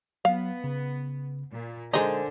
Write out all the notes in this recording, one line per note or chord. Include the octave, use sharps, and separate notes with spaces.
F#3 B3 F5
C#3
A#2
D3 G#3 D#4 A#4 C5 G#5